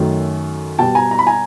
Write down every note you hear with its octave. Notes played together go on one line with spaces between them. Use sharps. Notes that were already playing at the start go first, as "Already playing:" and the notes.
Already playing: F#2 D#3 F#3 A3
B2 G3 G5 A5
G#5 A#5
A#5
B5
G#5 A#5